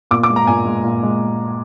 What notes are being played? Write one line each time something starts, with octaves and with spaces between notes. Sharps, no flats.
A#2 D6
D6
G#3
A#5
A#2 G#5
G#3
A#2
G#3